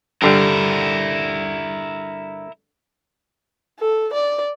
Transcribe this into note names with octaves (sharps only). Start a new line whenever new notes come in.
G2 D3 G3 E4 A#4
A4
D5